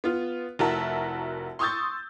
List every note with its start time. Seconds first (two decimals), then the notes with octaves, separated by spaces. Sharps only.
0.04 B3 F4
0.59 F1 E4 F#4 A#4 E5 A5
1.59 C6 C#6 D#6 E6 G6 A6